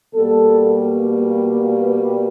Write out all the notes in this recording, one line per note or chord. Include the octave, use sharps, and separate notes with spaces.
B2 G3 A#3 A4
B4